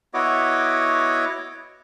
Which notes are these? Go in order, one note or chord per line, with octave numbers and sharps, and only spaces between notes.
B3 E4 F#4 C#5 D#5 D6